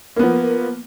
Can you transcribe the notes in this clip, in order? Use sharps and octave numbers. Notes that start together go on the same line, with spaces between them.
F3 A#3 B3